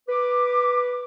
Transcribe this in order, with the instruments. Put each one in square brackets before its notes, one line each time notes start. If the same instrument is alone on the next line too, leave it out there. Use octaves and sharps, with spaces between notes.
[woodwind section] B4 D6